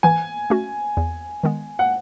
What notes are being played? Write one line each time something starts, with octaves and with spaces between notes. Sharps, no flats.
E3 G#5
A3 C#4 F#4
E2
D#3 G#3 B3
F#5